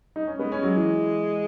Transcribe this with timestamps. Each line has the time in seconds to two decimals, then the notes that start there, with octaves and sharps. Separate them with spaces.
0.16 D#4
0.27 C#4
0.39 G#3 B3
0.52 C#4
0.63 F#3
0.76 E3